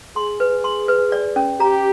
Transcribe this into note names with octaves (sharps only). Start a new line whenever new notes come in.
G#4 C6
B4
C6
B4
D5
C#4
G4 A#5